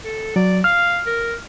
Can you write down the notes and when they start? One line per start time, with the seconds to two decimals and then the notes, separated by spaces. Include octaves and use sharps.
0.05 A4
0.36 F#3 D5
0.64 F5 F6
1.06 A#4